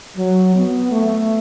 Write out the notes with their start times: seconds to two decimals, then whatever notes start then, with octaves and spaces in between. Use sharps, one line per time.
0.16 F#3
0.55 B3
0.92 A3